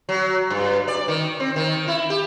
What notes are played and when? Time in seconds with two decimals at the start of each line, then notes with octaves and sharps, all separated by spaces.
0.09 F#3
0.50 G2
0.88 D5
1.08 D#3
1.40 C4
1.56 D#3
1.88 E4
2.10 G4